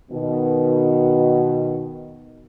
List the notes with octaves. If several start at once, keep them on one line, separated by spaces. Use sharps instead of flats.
B2 D#3